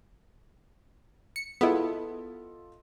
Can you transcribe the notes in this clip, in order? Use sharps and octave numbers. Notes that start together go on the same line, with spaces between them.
C#7
B3 E4 F4 A4 D#5